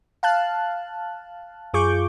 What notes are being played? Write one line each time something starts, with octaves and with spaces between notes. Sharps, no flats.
F5 A5 F#6
F#2 F4 G#4 C#6 D6 G6